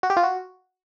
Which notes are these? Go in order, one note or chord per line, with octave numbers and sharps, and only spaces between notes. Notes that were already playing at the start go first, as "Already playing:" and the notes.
F#4
G4
F4
F#4